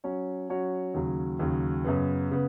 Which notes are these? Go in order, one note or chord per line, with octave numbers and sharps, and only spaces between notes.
F#3 C#4 F#4 C#5
F#3 C#4 F#4 C#5
D#2 C#3 F#3
D#2 C#3 F#3
F#2 C#3 B3
C#3 B3